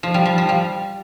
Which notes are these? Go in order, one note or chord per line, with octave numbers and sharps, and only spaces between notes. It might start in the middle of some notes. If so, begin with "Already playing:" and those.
F3
G3
F3
F3
G3